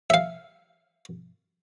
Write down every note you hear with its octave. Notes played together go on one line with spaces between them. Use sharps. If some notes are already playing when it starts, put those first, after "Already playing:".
E5 F5